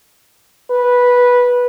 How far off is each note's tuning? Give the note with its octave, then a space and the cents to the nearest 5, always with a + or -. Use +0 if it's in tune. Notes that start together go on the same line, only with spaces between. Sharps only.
B4 -10